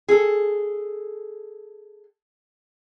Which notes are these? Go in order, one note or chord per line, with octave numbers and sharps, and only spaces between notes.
G#4 A4